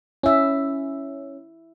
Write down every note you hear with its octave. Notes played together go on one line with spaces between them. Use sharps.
C#4 E4 E5